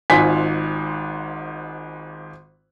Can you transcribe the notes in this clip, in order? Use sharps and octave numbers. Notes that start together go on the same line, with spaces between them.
G#1 G#2 F4 G#5 B6